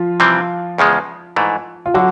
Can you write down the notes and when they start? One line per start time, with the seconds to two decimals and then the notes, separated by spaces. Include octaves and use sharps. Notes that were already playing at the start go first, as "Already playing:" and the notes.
Already playing: F3 F4
0.20 C3 E3 G3 C4
0.78 E2 C#3 F3 G#3
1.36 G#2 E3 A3
1.86 F4
1.94 D3 F#3 F#4